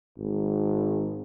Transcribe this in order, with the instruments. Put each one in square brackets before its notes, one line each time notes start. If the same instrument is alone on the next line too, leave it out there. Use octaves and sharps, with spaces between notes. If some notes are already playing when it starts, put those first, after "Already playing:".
[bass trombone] G#1